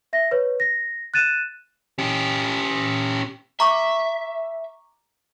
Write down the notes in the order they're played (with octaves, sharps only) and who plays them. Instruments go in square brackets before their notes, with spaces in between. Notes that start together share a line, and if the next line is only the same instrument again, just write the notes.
[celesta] E5 A#6
B4 C#5
A#6
F#6 A6 D#7 E7
[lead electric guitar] C#4 G4
[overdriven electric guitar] E5 [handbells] A#5 C#6 D6